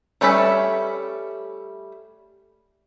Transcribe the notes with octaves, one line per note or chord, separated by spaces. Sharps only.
G3 A3 C#4 B4 E5